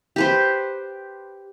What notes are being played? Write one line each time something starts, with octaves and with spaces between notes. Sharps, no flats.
G4 B4 C5